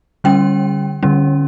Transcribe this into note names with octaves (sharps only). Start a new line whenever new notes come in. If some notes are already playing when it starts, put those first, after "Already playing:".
D3 G3 C#4 G5
D3 G3 C#4